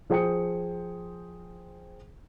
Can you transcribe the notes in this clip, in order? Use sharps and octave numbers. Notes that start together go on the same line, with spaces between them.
F3 G#4 C5 G5 D#6 C#7